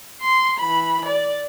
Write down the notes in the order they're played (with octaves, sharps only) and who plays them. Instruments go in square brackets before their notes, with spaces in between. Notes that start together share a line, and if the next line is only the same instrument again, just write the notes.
[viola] C6
E3 B5
D5